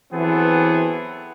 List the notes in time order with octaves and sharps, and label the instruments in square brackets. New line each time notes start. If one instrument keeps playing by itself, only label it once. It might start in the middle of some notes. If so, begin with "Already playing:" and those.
[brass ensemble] E3 F#3 B3 C4 G#4 A4